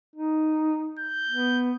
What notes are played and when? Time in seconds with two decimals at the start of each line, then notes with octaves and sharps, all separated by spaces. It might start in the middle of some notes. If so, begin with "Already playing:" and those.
0.16 D#4
0.99 G6
1.29 B3